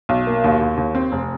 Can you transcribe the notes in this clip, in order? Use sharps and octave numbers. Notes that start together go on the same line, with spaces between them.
B1
A#3
D#2
D#2
D#2
C4
F1